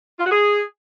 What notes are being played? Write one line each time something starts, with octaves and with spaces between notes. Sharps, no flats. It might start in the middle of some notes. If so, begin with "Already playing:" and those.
F4
F#4
G#4